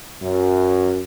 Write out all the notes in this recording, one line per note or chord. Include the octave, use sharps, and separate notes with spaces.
F#2